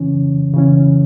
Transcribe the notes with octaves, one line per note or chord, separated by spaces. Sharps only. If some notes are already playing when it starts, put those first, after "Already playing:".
Already playing: C#3 E3 C#4
C#3 E3 C#4